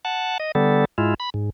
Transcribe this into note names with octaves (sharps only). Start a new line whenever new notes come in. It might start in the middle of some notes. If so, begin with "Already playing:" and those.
F#5 A5
D#5
D3 G3 B3 A4
G#2 G#3 E4 F4
B5
G#2